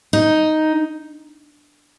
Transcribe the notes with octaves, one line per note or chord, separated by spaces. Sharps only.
D#4